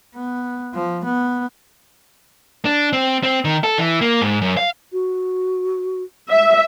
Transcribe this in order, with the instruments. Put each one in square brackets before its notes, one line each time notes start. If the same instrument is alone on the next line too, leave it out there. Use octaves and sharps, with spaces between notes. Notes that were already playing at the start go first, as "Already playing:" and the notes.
[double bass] B3
F3
B3
[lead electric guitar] D4
C4
C4
D#3
A4
E3
A#3
G#2
F#2
F5
[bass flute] F#4
[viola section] E5